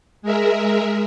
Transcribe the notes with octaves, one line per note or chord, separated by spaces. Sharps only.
G#3 G#4 A#4 E5